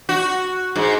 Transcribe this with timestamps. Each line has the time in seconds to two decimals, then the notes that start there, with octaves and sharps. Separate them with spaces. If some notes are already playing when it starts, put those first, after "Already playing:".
0.09 F#4
0.76 G#2